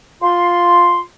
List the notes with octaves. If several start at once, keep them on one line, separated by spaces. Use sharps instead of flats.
F4 C6